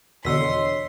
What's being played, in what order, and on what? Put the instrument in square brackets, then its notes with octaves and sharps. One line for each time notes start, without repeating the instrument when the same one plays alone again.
[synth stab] E2 B2 D3 [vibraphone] C#5 D#5 [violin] C6 [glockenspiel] E6 B6